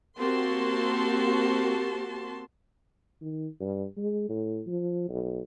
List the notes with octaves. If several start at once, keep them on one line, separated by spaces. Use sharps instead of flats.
A#3 C4 F#4 G4 A5 C6
D#3
G2
G#3
A2
F3
B1